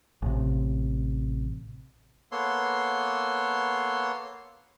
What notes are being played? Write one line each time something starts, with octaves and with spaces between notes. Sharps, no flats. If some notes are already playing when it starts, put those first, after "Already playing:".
A1 C3
A#3 B3 A4 C#5 C6